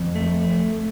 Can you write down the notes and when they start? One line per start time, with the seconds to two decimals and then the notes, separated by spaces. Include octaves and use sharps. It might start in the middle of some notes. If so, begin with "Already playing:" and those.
Already playing: F2
0.15 A3